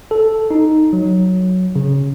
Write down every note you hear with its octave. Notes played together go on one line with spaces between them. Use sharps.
A4
D#4
F#3
C#3